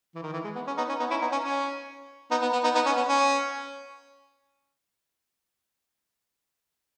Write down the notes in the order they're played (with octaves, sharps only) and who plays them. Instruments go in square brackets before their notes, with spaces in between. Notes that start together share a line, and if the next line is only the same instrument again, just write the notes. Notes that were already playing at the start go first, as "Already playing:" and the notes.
[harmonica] E3
D#3
E3
G#3
B3
C#4
B3 D#4
C#4
B3 D#4
C#4 E4
B3 D#4
C#4
C#4
B3 D#4
B3
B3
B3 D#4
B3 D#4
C#4
B3
C#4